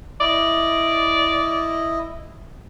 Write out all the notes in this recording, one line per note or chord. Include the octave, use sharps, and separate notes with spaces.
E4 D5 D#5